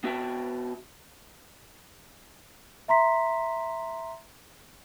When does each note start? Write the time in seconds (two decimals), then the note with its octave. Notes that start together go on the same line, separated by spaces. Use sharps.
0.04 B3 F#4 E5 G5 A5
2.88 E5 A#5 C6 B6